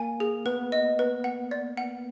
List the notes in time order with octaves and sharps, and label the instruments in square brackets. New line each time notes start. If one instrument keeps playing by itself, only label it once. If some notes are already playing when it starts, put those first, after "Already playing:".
Already playing: [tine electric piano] A#3 [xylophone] G#5
[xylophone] G#4
[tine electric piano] B3 [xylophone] B4
[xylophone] D#5
B4
F#5
D5
F#5